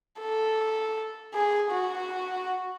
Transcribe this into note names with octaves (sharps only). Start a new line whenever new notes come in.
A4
G#4
F#4